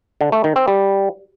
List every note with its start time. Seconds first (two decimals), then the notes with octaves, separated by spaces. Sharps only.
0.21 D3
0.32 A3
0.44 D#3
0.56 C4
0.68 G3